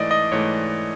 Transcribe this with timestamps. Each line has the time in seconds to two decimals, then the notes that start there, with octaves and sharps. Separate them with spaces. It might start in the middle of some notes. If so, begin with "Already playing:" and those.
Already playing: G#2 E3 A3 D5 D#5
0.11 D#5
0.32 G#2 E3 A3 C#5